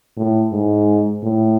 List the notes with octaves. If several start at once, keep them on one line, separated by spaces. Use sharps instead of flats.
A2
G#2
A2